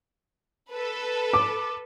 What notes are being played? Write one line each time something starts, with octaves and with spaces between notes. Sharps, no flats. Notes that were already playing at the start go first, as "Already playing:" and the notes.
A4 B4
D6